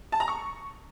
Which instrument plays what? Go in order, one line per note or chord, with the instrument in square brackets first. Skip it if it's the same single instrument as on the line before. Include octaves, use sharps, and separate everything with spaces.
[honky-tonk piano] A5
A#5
C#6